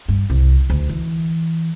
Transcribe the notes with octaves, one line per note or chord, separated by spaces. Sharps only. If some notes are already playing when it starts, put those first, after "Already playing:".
G2
C2
D2
E3